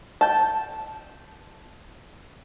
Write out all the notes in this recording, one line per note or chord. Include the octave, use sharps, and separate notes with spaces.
G5 A5